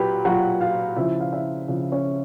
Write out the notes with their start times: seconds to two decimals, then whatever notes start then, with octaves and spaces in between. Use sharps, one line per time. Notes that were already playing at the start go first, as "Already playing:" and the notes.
Already playing: A#2 F#3 G4 B4 G5 B5
0.25 A#2 F#3 F#4 F#5
0.60 F4 F5
0.96 C#3 F3 E4 E5
1.20 F5
1.32 E4 E5
1.68 C#3 F3
1.92 C#4 C#5